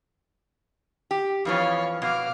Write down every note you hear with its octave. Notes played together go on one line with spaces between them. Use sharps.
G4
F2 E3 F3 C#5 F5
B2 F#4 F5 D6